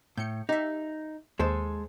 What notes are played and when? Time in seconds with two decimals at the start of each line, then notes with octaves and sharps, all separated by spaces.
0.17 A2 G6 C#7
0.49 D#4 G4 E5
1.39 D#2 G#3 A4 C5